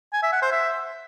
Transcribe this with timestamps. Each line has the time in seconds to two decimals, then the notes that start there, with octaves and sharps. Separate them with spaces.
0.13 G#5
0.23 E5
0.32 F#5
0.42 C5
0.51 E5